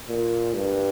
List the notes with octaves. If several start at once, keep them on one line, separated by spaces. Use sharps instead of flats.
A#2
G2